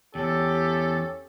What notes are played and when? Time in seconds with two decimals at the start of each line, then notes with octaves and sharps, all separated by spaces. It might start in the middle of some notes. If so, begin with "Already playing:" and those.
0.15 E2 C#4 G4 A4